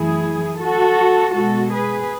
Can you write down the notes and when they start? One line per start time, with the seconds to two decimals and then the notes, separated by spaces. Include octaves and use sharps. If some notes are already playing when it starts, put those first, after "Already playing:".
Already playing: F#2 E3 A3 E4 G#4
0.59 F#4 A4
1.34 B2 G#3 F#4 A4
1.71 G#4 B4